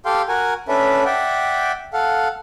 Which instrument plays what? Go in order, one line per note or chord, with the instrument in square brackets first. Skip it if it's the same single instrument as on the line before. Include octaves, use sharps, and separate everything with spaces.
[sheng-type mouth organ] G4 A4 F5 G5 C6
F#4 A#4 F#5 G#5
C#4 D4 A4 B4 E5
D5 E5 F#5 G5
A4 F5 F#5